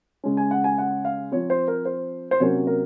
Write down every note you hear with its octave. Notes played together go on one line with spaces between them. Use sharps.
C#3 G#3 C#4
G#5
F#5
G#5
F#5
F5
F3 C4 C#5
C5
A#4
C5
C5
C3 F#3 A#3 C#4 C#5
A#4